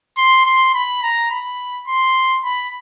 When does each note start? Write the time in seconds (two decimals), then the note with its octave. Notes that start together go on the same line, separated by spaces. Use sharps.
0.17 C6
0.46 C6
0.75 B5
1.03 A#5
1.31 B5
1.88 C6
2.44 B5